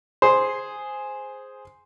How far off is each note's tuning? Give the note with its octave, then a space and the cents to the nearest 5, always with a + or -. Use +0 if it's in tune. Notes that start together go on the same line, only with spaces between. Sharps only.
G#4 +0 C5 +0